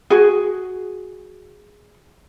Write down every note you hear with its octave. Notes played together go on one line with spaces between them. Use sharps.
F#4 G#4